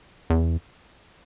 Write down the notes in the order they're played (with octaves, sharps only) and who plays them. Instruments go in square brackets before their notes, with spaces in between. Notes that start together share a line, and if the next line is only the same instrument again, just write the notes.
[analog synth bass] E2